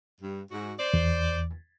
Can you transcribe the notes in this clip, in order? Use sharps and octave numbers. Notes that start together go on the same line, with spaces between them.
G2
G#2 F#4
C5 D5
E2